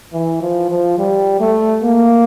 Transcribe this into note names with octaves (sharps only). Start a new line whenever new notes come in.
E3
F3
F3
G3
A3
A#3